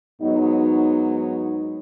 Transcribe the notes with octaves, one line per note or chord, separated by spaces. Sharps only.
G#2 F#3 B3 D#4